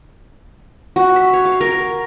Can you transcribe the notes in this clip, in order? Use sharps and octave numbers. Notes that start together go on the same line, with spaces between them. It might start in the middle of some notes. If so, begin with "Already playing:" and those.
F#4
E5
C#5
F5
A#4